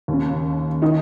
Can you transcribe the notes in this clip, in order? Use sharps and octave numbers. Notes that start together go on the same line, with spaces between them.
D#2 C#3
D#3 D#4